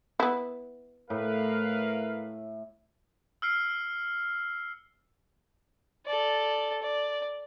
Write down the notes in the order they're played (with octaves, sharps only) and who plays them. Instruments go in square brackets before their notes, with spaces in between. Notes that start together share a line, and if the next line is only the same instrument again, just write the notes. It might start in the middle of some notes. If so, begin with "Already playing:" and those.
[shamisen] B3 E4
[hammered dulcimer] A2 [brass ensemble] A#4 B4 F5
[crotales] E6 F6 C7 C#7
[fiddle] A4 D5
D5